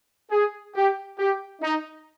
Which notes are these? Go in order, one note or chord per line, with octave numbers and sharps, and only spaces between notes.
G#4
G4
G4
D#4